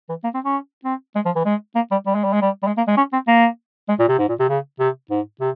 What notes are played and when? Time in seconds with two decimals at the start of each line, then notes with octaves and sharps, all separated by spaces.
0.09 E3
0.24 A#3
0.34 C4
0.45 C#4
0.85 C4
1.15 G#3
1.25 F3
1.35 E3
1.45 G#3
1.75 A#3
1.91 G3
2.06 G3
2.15 G#3
2.24 G3
2.33 G#3
2.42 G3
2.63 G3
2.67 G#3
2.77 A#3
2.87 G#3
2.97 C#4
3.13 C4
3.28 A#3
3.89 G#3
3.99 A#2
4.08 C3
4.19 G#2
4.29 A#2
4.39 C3
4.49 C#3
4.80 C3
5.11 G#2
5.40 C3